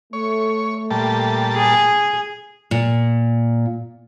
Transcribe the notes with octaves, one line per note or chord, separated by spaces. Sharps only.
A3 C#5
A#2 G3 A5
G#4
A#2